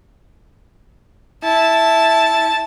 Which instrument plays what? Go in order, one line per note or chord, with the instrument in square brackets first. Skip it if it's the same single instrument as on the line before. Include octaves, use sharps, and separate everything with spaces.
[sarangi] E4 [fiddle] A5